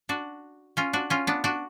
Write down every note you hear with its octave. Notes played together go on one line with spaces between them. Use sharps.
D4 F#4
C#4 F4
D4 F#4
C#4 F4
B3 D4
D4 F#4